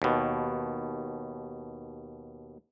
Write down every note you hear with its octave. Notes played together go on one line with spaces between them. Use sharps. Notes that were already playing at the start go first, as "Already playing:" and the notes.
D#2 B2